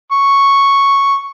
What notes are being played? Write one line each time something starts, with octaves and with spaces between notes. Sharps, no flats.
C#6